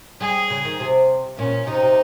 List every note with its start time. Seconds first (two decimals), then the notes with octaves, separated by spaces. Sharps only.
0.21 G3 G#4
0.50 C#3
0.65 D#3
0.80 C3
1.37 A#2 C#4
1.67 C3 D#4
1.82 C3